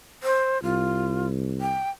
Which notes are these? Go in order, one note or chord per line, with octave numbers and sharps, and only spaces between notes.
C5
C2 F4
G5